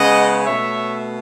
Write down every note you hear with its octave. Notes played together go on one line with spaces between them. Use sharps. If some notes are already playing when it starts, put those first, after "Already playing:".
Already playing: C#3 G#3 B3 D#5 F#5
B2 A3 C#5 E5